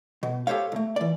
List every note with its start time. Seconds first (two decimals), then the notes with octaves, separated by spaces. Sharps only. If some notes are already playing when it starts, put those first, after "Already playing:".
0.23 B2
0.47 G4 A4 C5 C#5 F5
0.72 B1 A3
0.96 E3 D5